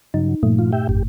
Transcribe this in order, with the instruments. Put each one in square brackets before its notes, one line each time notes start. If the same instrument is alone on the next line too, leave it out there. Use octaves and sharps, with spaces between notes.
[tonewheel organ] G2 C#3 F#3 [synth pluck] D#4
[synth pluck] G2 A#2 A3 [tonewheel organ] F3
[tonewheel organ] F3 F4
G4 E5 G5
[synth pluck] G1 [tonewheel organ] F2 G4